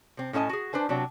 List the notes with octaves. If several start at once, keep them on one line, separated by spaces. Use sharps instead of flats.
C3 C4
A2 C#4 A4 D#5 G#5
F#4 G#4
D4 B4 C5 G#5
C3 F#3 D4